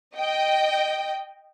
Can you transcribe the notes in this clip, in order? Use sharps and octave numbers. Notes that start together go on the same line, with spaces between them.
D#5 G5